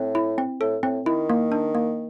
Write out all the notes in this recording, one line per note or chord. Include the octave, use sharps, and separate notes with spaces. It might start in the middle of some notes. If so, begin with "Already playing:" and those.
Already playing: A2 C4
E4
C4
A2 A4
A2 C4
D#3 E4
A#3
D4
A#3